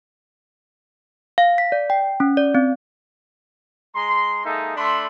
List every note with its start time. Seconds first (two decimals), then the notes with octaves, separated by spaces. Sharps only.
1.38 F5
1.58 B6
1.72 D5
1.90 G5
2.20 C#4
2.37 D5
2.55 C4
3.95 G#3 A#5 C6
4.44 G#3 A#3 D#4 A4 E5
4.76 A3 D4 B5 C6